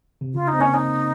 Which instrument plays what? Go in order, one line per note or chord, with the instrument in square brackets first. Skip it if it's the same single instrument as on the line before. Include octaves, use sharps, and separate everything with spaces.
[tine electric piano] C3
[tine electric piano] C#3 [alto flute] F4
[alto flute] D#4
[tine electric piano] C4
[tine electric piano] A#3 [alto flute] C#4
[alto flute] D#4